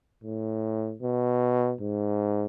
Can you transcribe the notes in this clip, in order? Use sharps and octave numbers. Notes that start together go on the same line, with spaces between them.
A2
B2
G#2